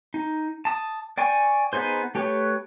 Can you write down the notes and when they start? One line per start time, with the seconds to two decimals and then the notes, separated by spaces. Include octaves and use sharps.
0.14 D#4
0.65 A5 D#6
1.18 D5 G5 G#5 C#6
1.73 B3 D#4 G#4 C5
2.15 A3 G4 B4 C#5